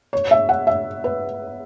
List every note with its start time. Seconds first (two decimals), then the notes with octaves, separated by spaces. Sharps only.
0.13 C#5
0.31 E5
0.49 F#5
0.67 E5
1.04 B4